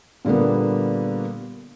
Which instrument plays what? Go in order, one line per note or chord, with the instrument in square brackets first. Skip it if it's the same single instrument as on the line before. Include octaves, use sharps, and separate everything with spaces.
[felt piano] A#2 D3 G3 A#3 B3